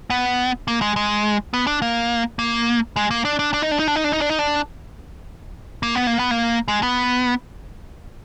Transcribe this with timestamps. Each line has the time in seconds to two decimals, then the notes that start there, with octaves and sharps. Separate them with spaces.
0.10 B3
0.68 A#3
0.82 G#3
0.96 G#3
1.54 B3
1.67 D4
1.82 A#3
2.39 A#3
2.96 G#3
3.11 A#3
3.25 D4
3.39 D4
3.54 D4
3.62 D#4
3.71 D4
3.79 D#4
3.88 D4
3.96 D#4
4.04 D4
4.13 D#4
4.21 D4
4.30 D#4
4.39 D4
5.83 A#3
5.95 B3
6.07 A#3
6.19 B3
6.31 A#3
6.68 G#3
6.83 B3